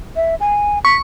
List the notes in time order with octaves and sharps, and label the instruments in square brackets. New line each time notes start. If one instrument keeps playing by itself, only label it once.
[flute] E5
G#5
[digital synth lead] C#6 [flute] B6